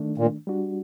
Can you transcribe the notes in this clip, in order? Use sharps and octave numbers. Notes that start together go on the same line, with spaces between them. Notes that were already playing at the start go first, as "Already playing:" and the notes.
Already playing: D#3 A3 D4
A#2
G3 D4 F#4